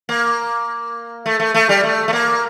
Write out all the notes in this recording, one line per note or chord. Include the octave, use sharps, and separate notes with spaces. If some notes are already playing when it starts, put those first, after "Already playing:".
A#3
A3
A3
A3
G3
A3
A3
A#3